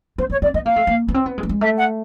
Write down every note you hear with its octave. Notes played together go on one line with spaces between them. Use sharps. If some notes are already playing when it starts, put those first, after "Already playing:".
B3 C5
B3 C#5
C4 D5
B3 D#5
A#3 F5
A3
A#3
B3
C4
B3
G#3
A3
G#3
A3 E5
F#5